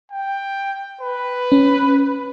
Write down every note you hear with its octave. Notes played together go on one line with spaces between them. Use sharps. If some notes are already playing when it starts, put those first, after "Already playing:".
G5
B4
C#4